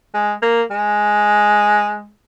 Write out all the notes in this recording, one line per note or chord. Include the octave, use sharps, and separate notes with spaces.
G#3
A#3
G#3